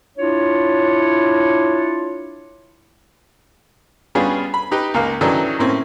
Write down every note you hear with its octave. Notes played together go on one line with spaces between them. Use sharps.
D4 E4 F4 C#5
G3 B3 C#4 D4 F4 G#4
B5
D#4 G4 B4
C#2 A#3 F5
D#3 E3 F#3 C#4 D4 A4
A2 A#3 C4 C#4